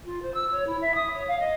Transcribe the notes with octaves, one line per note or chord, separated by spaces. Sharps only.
F4
C5
E6
C#5
E4
E5
D#6
C#5
F5
D#5